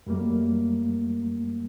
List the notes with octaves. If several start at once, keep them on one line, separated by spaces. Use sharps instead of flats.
F#2 G3 A3 A#3